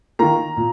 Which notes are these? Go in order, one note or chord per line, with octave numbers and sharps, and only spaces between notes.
D#3 A#3 A#5
A#2